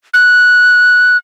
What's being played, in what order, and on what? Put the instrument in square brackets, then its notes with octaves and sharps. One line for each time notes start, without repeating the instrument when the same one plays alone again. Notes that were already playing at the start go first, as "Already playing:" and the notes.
[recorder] F#6